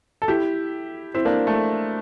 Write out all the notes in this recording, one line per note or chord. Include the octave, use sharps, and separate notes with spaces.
A4
E4 G4
C4 E4
A#3 D4
A3